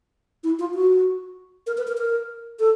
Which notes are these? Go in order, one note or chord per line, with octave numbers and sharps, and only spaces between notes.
E4
F4
F#4
A#4
B4
A#4
A#4
A4